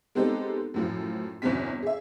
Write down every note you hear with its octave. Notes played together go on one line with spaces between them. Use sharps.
G#3 B3 C4 D#4 G4 A4
F#2 A2 F3
G1 E2 B2 C4 C#4 B6
G#4 E5